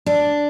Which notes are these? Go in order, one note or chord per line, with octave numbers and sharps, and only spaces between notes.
D4